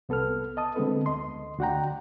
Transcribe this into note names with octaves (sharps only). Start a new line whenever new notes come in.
C2 B3 A4 B4 F6
D#5 A5 D#6
D3 G#3 B3 C4 A4 B4
D2 D#5 C6
D2 F#4 D5 F#5 G5 A#5